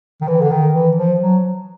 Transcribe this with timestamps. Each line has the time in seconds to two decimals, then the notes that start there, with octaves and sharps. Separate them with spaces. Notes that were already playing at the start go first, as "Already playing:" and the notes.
0.21 D#3
0.27 E3
0.42 D3
0.51 D#3
0.73 E3
0.97 F3
1.20 F#3